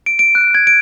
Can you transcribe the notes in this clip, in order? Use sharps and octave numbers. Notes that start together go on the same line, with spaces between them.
D7
D7
F#6
G#6
D7